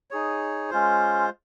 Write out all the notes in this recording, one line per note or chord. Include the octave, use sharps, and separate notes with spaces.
D#4 G#4 C#5
G#3 C#4 F4 C5